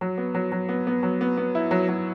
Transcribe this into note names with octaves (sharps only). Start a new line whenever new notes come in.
F#3
B3
F#3
F#3
B3
B3
F#3
B3
B3
E4
F#3
F#3